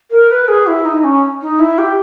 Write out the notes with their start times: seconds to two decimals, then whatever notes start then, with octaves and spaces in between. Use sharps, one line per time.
0.11 A#4
0.30 B4
0.48 G#4
0.67 E4
0.85 D#4
1.04 C#4
1.42 D#4
1.59 E4
1.78 G4